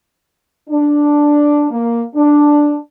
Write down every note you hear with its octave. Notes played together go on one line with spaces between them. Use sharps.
D4
A#3
D4